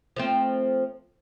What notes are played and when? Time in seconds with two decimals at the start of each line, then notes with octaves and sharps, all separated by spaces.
0.16 F3 A3 C4